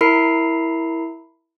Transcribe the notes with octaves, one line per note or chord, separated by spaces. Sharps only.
E4 A#4 B5 C7